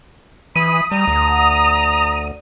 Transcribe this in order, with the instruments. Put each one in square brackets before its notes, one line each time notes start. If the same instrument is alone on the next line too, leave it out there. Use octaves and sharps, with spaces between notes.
[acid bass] E3 [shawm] B5 [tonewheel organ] D#6
[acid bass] G3 [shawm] A#5
[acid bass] D2